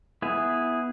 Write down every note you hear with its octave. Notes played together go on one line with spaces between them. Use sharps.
B3 E4 G#4